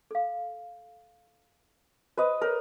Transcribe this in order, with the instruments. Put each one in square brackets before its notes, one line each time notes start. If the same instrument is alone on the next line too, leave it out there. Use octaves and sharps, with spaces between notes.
[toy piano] A4 F5
[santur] B4 D#5 [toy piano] C5 C6
[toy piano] A4 C#5 [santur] A#4